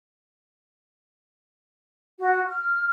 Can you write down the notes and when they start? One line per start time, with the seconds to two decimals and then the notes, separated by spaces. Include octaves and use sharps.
2.19 F#4
2.47 F6